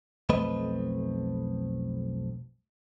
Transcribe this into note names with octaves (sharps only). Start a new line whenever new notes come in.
B1 F2 A3 C4 B4 D#5